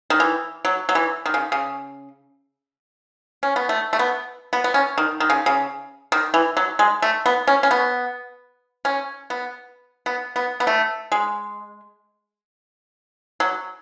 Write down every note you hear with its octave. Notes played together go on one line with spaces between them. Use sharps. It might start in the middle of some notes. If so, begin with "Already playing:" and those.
D#3
E3
F#3
F#3
E3
D#3
C#3
C#3
C#4
B3
A3
A3
B3
B3
B3
C#4
D#3
D#3
C#3
C#3
D#3
E3
F#3
G#3
A3
B3
C#4
C#4
B3
C#4
B3
B3
B3
B3
A3
G#3
F#3